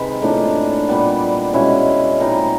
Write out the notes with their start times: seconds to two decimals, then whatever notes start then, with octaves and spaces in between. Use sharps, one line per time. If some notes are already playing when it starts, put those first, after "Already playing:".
Already playing: C3 D#3 G#3 B4
0.22 A2 F3 A#3 D4
0.88 A#2 G3 B3
1.53 B2 G#3 C#4 E4
2.20 A#2 G3 C4 D#4 A#4